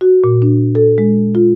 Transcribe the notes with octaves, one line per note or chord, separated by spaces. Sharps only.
F#4
A#2
D4
A4
G#3
F4